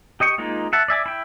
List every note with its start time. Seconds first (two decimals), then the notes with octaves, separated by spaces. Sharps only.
0.20 G4 D#5 G5 C#6
0.38 G#3 A#3 D#4 F4
0.73 E5 F#5 A5
0.88 D5 E5 G#5 D6
1.06 E4 G5